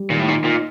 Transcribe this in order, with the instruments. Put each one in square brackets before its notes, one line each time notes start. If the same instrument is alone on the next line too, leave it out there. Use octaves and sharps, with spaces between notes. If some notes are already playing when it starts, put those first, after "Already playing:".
Already playing: [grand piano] G3
[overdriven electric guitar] A#2 [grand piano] D#3
[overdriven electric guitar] A2
[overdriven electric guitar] A#2 [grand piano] D#4
[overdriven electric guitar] A#2 [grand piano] D#4